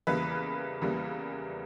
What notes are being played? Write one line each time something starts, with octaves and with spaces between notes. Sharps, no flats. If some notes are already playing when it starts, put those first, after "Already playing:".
E2 C#3 E3 G3 A#3 B4
E2 C#3 E3 G3 A#3